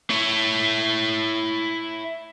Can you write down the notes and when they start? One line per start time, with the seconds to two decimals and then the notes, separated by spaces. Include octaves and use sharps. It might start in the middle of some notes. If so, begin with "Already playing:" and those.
0.10 E4 C#5